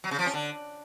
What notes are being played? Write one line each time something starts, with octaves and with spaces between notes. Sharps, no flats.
F#3
C#3
F3
C#4
D3